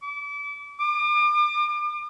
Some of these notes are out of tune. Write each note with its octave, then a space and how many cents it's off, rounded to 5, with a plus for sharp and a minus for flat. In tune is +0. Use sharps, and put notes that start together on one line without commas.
D6 -35
D6 +40